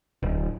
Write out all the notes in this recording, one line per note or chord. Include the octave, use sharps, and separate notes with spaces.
D1